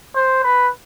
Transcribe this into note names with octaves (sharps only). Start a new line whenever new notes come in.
C5
B4